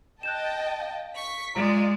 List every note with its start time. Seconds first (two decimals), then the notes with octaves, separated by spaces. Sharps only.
0.23 D#5 G5 A5 F#6 G6 E7
0.81 F5
1.15 C#6 B6
1.55 G#3 F4 D5 A#5